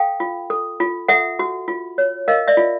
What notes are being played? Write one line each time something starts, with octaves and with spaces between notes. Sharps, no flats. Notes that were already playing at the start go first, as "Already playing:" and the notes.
Already playing: A4 F5 G5
F4
A4
F4
A4 E5 F#5
F#4
F4
C#5
A#4 D#5 F5
D5 E5
F4